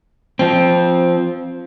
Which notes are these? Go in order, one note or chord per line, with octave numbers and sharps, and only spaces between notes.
F3 C4